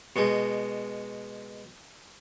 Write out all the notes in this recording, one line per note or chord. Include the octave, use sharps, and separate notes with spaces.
B2 G#3